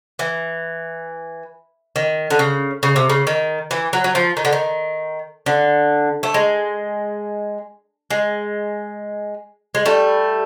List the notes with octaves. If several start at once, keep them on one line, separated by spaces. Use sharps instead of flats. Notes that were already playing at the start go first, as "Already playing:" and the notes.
E3
D#3
D3
C#3
C#3
C3
C#3
D#3
E3
F#3
F#3
F3
D#3
D3
D#3
D3
A3
G#3
G#3
G#3
G3 A3